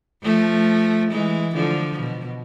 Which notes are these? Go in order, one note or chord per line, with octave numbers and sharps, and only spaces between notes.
F3 A3
E3 G#3
D3 F3
B2